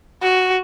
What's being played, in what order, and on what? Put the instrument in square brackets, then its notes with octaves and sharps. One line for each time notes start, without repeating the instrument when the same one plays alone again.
[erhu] F#4